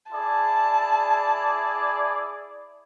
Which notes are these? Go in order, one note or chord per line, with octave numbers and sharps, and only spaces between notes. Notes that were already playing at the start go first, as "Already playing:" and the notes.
E4 G#4 D5 A5